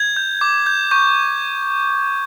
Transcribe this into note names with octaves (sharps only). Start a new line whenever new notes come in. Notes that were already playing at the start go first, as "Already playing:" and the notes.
Already playing: G#6
G6
D6
G6
C#6 G6